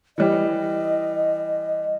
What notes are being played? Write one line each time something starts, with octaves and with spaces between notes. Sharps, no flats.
E3 G3 D#5